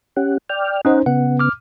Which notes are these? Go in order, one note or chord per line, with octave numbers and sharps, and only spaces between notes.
C#4 G4 F#5
D5 G5 F6
C#4 D#4 C5 D#5 F#5
C#3 B3 F#5
D6 F6